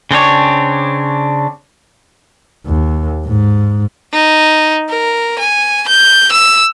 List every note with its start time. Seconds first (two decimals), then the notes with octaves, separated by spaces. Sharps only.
0.11 C#3 C4 D4 C#5
2.66 D#2
3.26 G#2
4.13 D#4
4.89 A#4
5.39 G#5
5.88 G6
6.31 E6